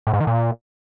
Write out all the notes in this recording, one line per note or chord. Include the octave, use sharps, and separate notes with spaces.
A2
G#2
D#3
A#2